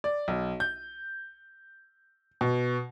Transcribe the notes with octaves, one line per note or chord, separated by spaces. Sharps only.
D5
B1
G6
B2